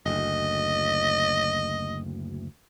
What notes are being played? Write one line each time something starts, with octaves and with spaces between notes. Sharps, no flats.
F#1 D2 D#5